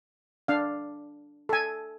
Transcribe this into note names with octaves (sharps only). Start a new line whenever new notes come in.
D4 F5
A4 G#5